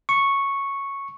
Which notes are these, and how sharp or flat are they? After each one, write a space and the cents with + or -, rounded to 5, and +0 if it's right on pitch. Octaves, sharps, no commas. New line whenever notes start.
C#6 -5